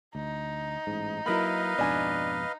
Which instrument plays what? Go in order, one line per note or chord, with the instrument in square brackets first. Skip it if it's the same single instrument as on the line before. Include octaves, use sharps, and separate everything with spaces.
[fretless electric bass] D2 [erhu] D#4
[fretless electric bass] A1 G#2
[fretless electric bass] F#3 A#3 [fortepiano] E4 A#4 B5 [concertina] B4 D#5 F5
[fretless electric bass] F2 G#2 B2 [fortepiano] D4 G#5